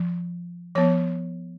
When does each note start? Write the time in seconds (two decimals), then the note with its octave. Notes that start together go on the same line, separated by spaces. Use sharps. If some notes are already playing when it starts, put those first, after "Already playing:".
Already playing: F3
0.75 F3 B3 C#5